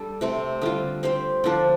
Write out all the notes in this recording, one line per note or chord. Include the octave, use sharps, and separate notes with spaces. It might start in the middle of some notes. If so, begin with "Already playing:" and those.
Already playing: G3 D4 A4
C3 A3 C4
D3 G3 F4
C4 G4 C5
D3 F3 D4